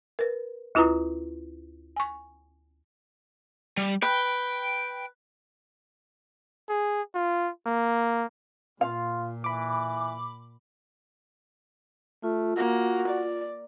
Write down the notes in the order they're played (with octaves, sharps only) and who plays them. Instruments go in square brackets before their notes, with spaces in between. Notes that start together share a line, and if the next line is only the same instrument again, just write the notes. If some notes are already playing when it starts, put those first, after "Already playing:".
[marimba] A#4 B4
D2 E4 F4 B4 A#5 D#6
G#5 C#6
[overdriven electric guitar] G3
[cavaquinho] B4 [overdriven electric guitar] G5
[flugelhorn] G#4
F4
A#3
[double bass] A#2 [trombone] F4 [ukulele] F5
[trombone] E3 [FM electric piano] B5 D6
[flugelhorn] A3 [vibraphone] F4
[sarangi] A#3 [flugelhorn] F#4
[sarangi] D5